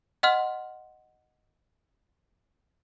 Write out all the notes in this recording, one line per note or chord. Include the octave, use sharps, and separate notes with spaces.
D#5 F#5 C6 F6